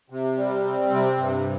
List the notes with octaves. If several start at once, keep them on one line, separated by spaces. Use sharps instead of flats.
C3
G3
C4
C3
G2